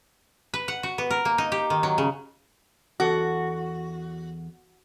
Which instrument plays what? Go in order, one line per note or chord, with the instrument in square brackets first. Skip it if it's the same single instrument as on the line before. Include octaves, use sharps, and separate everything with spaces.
[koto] B4
F#5
F#4
B3
A#4
A#3
D#4
G4
D#3
F#3
C#3
[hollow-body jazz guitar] E2 A4 [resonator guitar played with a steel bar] F#4